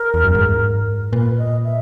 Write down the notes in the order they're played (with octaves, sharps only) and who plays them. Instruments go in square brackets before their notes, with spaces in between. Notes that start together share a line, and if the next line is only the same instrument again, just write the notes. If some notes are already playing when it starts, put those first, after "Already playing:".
Already playing: [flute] A#4
[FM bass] E2
F#2
G#2
[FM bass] A#2 [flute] B4
[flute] D#5
E5